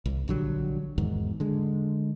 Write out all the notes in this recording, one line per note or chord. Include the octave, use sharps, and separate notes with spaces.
C2
A#1 D3 F#3 G3
E2 G#2 D#3
D3 G#3